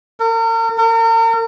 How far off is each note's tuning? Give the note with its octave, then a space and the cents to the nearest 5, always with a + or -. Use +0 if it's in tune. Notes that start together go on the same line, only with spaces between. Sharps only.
A#4 -40
A#4 -40